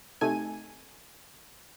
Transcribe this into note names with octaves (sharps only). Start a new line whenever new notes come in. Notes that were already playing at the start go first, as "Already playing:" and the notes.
C3 A3 D#4 A4 G#5 D#7